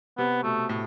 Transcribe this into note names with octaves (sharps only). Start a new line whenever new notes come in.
C3 B3
B2 A3
A2